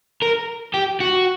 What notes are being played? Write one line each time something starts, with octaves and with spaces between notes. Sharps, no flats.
A#4
G4
F#4